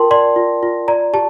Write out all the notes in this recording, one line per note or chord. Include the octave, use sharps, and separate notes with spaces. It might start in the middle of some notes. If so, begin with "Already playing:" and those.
Already playing: F4 A#4 G5 A5 C6
D5 C6
F4
F4
D5 A#5
G4 A5